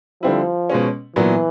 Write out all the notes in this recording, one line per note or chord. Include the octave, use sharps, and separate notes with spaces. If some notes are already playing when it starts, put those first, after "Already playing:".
D3 F3 G3 C4 E4
B2 G#3 C#4
A#2 E3 F#3 B3 D4